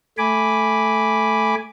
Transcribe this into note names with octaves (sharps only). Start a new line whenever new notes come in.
A3 G#5 B5 D6